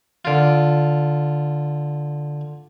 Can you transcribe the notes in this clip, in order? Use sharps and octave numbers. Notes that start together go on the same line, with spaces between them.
D3 F4